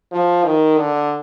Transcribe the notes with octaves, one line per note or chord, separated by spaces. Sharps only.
F3
D#3
D3